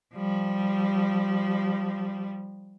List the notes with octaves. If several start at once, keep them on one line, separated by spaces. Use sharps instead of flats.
F3 G3